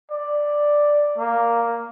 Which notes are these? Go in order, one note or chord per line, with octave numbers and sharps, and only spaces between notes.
D5
A#3